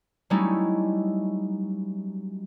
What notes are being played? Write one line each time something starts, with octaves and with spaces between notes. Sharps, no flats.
F#3 G3 A3 C#4 D#4 E4